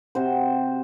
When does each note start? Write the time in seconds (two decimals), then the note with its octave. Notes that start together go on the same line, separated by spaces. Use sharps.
0.15 C3 F#4 C5